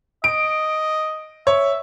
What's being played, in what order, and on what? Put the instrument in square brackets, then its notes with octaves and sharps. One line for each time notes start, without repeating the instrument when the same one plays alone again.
[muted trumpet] D#5 [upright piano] D7
[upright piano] C#5 [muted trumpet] E5